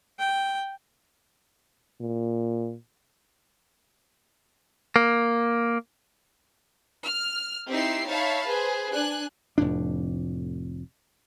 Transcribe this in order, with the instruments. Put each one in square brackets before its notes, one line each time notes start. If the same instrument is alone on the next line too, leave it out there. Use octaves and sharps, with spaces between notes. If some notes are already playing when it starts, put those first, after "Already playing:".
[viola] G5
[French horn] A#2
[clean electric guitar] A#3
[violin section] F6
C4 D#4 E4 G4 E6 C7
D#4 C#5 E5 F5 A5 B5
G#4 B4 C5
D4 G#5 F#6
[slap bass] F1 F2 A2 D4